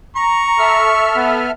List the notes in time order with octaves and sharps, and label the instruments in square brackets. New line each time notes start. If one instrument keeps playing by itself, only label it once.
[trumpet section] A#5 [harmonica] C#6
[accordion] A4 E5 F6
[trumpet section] B3